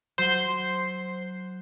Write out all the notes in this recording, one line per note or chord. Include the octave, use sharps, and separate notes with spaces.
F#3 C5 C6